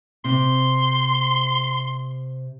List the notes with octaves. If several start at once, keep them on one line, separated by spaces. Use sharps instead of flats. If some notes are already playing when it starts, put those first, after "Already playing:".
C3 C6